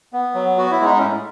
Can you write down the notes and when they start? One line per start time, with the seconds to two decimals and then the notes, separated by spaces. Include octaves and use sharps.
0.13 B3
0.35 F#3
0.57 B3 F#4
0.71 E4
0.80 G#3 D#4
0.98 C#4 E4
1.02 A2